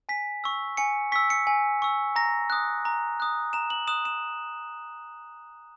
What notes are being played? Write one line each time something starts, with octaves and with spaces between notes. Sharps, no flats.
G#5 B6
C#6 E6
G#5 C#7
C#6 E6 B6
C#7
G#5
C#6 E6
A#5 A#6
D#6 F#6
A#5
D#6 F#6
A#5 E7
F#7
D#6 F#6 E7
E7